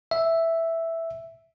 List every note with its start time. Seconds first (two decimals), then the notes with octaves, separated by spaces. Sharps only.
0.11 E5